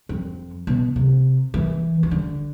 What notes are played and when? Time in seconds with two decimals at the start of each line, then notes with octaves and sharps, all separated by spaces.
0.09 F2
0.67 B2
0.96 C3
1.54 E3
2.03 E3
2.11 D3